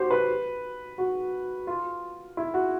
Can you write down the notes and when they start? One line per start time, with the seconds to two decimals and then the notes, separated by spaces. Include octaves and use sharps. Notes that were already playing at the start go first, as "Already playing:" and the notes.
Already playing: F#4 G4 C5
0.11 B4
0.98 F#4
1.67 F4
2.37 E4
2.54 F#4